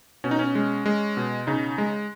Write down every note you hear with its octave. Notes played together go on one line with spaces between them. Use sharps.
B2 C#4
D#4
C#4
G#3
G#3
B2
C#3 D#4
G#3